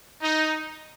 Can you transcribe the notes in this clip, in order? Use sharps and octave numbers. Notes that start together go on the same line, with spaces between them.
D#4